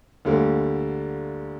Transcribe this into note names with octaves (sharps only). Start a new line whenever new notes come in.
D2 D3 G3 A#3